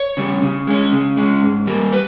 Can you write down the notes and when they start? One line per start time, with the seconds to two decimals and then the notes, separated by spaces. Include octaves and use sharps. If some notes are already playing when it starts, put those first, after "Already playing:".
Already playing: C#5
0.17 C#3 G3
0.42 C#3
0.67 G#3 C#4
0.92 C#3
1.17 G#3 C#4
1.42 G#2
1.67 G3 A#3
1.93 B4